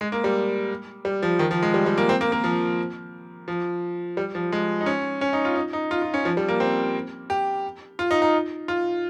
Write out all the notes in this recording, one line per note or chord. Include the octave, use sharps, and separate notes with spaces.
G#3
A#3
G3
G3
F3
D#3
F3
G#3
G3
G3
A#3
C4
A#3
A#3
F3
F3
G3
F3
G#3
D#4
C#4
C#4
D#4
F4
D#4
D#4
F4
F4
C#4
F3
G3
A#3
C4
G4
F4
D#4
D#4
F4